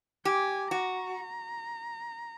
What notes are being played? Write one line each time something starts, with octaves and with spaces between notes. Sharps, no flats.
G4 G#5
F#4 A#5